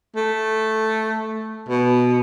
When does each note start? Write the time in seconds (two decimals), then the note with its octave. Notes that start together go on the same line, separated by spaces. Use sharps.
0.16 A3
1.69 B2